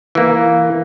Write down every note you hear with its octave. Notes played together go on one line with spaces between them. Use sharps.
E3 A#3